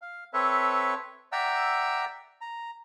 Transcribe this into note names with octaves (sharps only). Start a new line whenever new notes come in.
F5
C4 A4 B4 C#5 E5
D5 E5 F#5 G5 A#5 E6
A#5